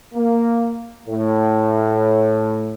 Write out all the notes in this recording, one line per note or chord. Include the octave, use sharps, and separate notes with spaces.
A#3
A2